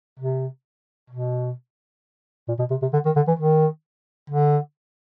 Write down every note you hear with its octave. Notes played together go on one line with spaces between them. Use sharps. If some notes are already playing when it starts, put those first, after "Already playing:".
C3
B2
A#2
B2
C3
C3
D3
D#3
D3
E3
D#3
D3